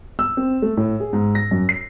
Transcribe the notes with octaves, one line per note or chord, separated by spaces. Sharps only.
E6
C4
A3
A2
G#4
G#2
A#6
F#2
C7